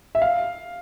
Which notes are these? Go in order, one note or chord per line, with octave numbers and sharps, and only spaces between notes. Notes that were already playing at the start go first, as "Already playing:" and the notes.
E5
F5